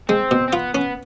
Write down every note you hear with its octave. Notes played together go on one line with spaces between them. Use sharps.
G#3 C4
B2
C4
B3 F4
B3 C#4